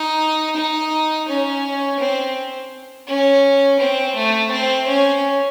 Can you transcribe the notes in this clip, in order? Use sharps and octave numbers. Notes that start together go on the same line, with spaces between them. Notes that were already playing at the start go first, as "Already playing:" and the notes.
Already playing: D#4
D#4
C#4
C4
C#4
C4
A3
C4
C#4